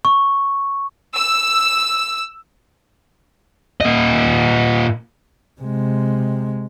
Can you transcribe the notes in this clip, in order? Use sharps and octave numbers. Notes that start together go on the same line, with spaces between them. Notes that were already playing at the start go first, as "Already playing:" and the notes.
C#6
E6
A#2 D#5
C3 G#3